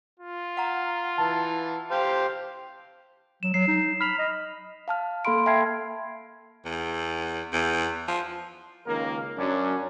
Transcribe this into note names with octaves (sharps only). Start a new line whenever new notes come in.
F4
F#5 A#5
E3 A5
G4 C5 F5
F#3 E7
F#3 C7
D#4
B5 F6 F7
D#5
F5 A5 F6
A#3 A4 F5 B5 C6 D7
E5 G5 A5 F6 G#6 C7
E2
E2
F3
C#2 D#3 A#3 A#4
F#2 F#3 C#4 D4